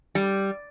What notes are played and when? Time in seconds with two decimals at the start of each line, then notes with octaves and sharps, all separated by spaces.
0.15 G3